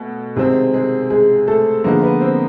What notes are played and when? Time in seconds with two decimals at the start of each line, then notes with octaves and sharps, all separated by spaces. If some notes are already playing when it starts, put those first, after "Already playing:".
Already playing: B2 A3
0.36 C3 D#3 G#3 C4 G#4
0.73 G#3 G#4
1.10 G#3 G#4
1.47 A3 A4
1.84 D3 F3 G#3 A#3 B3 D#4 A#4
2.03 B3 B4
2.21 C4 C5